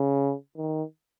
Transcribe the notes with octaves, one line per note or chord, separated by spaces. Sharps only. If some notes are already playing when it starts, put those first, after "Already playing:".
Already playing: C#3
D#3